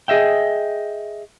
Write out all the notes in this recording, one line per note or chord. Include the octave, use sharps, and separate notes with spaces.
G#4 D#5 E5 G5